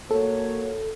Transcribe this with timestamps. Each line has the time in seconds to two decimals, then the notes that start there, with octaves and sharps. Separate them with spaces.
0.11 A#3 F#4 A4 C#5